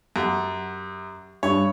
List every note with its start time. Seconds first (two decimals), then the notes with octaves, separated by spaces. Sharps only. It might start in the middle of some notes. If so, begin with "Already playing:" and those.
0.16 F#2 G4 F#5
1.43 G2 C#5